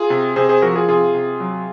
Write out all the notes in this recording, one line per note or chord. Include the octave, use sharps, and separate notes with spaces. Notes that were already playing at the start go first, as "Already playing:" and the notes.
Already playing: F4 G#4
C3
C3 G#4 C5
G#4 C5
F3 F#4 A#4
F4 G#4
C3 F4 G#4
C3
F#3